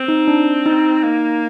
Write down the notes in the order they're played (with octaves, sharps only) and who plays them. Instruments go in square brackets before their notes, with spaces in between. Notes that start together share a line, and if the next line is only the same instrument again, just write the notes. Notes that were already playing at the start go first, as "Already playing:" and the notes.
Already playing: [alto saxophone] C4
[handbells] D#4
D4
D#4
[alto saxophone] A#3 [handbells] D#4